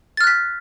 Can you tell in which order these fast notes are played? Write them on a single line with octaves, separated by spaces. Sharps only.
A6 F6 F#6 B6